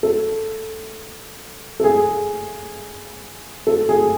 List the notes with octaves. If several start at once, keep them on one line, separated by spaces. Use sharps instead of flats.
A4
A4
G#4
A4
G#4